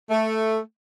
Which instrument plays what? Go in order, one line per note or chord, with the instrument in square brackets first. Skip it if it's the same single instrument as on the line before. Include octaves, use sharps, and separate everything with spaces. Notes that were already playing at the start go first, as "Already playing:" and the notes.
[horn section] A3